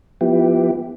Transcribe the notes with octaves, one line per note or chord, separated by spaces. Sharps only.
F3 B3 E4 G4